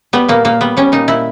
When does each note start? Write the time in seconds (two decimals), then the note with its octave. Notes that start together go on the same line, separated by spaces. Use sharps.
0.13 G3 B3
0.28 A#2 A#3
0.45 A#2 A#3
0.61 G3 B3
0.77 G3 C#4
0.92 A#2 D#4
1.08 A#2 E4